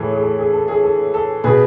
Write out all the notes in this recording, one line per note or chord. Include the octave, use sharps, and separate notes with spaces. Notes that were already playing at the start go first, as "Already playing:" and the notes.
Already playing: A2 E3 G#4 A4 B4 C#5
G#4
A4
G#4
A4
G#4
A4
A4
B2 G#4 B4